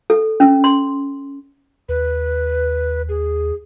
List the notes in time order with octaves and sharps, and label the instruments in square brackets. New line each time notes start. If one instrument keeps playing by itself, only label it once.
[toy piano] A4
C#4
C6
[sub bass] D#2 [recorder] B4
[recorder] G#4